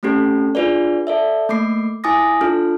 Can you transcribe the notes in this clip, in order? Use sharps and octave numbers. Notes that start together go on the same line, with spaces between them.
A3 C4 C#4 G4 A4
D4 F4 G#4 B4 D5
A4 D5 E5
A3 A#3 D6 C7
E4 G#5 D6 D#6 A#6
D4 F4 A4 F6